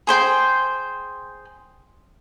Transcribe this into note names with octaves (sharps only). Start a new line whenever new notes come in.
G#4 C5 G5 C6